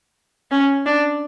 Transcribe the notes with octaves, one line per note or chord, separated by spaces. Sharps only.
C#4
D4